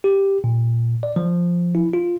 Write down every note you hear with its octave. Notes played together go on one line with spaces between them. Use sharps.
G4
A#2
D5
F3
E4
F4